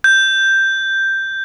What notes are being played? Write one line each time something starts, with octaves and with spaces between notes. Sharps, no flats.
G6